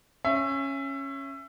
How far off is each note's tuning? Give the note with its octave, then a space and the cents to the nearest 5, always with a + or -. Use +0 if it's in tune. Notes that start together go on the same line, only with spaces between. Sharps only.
C#4 -10 E5 +25